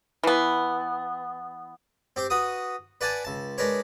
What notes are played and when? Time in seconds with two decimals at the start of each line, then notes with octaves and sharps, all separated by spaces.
0.24 E3 B3
2.16 C4 G4 C5
2.30 F#4 B4 D#6
3.01 B4 D5 F#5 G#5 A5
3.25 C#2 A5
3.58 G#3 D4 A#4 B4 C#5